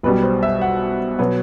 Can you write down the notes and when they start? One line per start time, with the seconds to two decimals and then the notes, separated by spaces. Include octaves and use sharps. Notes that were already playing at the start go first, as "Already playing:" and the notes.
0.03 B1 B2 G3 B4
0.23 C5
0.43 E5
0.61 F#5
1.19 B2 F#3 B3